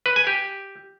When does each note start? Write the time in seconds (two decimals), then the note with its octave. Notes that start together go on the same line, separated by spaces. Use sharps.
0.06 B4
0.16 G#5
0.27 G4